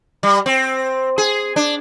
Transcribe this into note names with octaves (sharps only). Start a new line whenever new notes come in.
G3
C4
G#4
D4